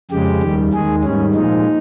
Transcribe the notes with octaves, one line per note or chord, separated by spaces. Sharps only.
F2 C#3 G#3 G4
D#2 D#3 G3
D#2 D#3 G#3 G#4
G#2 D#3 G3 C#4
A#2 F3 G#3 D#4